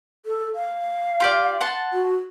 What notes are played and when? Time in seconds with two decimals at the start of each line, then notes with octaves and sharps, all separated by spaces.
0.26 A4
0.55 F5
1.20 F4 G4 D5
1.61 F#5 A5 C6
1.93 F#4